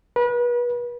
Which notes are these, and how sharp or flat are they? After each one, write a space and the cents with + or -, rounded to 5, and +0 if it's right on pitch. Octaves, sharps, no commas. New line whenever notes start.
B4 -35